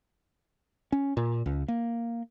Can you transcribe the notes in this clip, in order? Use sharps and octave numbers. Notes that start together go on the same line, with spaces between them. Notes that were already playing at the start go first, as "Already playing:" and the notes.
C#4
A#2
C#2
A#3